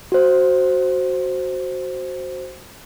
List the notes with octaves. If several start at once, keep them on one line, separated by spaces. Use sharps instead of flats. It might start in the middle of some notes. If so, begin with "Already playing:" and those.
F#4 C5